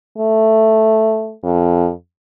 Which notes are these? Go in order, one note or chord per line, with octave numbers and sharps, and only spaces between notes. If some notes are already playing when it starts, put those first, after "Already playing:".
A3
F2